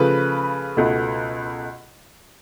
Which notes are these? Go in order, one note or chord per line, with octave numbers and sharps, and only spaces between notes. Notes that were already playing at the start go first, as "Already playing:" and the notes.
Already playing: C#3 F3 A3 B4
C#2 B2 A3